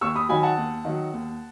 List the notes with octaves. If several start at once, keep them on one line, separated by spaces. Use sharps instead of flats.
D#2 C#6 E6
B5 D#6
D#3 F#3 G#5 B5
F#5 A5
D#2
D#3 F#3
D#2